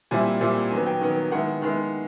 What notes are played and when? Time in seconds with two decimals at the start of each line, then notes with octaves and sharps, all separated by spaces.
0.11 A#2 G3 C4 E4 G#5
0.40 A#2 G3 C4 E4
0.71 D#3 F#3 B3 G#5
0.86 G5
1.01 D#3 F#3 B3
1.31 D#3 G#3 B3 E4 F#5
1.62 D#3 G#3 B3 E4